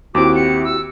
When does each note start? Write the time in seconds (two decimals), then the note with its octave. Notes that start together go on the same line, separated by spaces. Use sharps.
0.15 D#2 C4 E4 F#4 G4 D6
0.36 C#7
0.64 E6